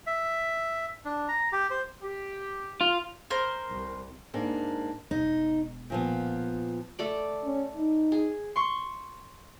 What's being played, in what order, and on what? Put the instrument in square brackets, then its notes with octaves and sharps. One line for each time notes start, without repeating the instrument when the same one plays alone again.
[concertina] E5
D4
A#5
G4
C5
[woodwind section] G4
[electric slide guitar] F4
[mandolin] A#4 C5
[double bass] C2
[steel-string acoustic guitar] G#2 A#3 D4
[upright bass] E1 B2 [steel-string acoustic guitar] D#4
[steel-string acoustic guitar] A#2 F3 B3
[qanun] A3 A4 D5
[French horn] C#4
D#4
[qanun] G#4
[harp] C6 C#6